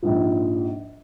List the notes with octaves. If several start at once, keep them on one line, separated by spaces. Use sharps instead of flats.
A#1 G#2 F3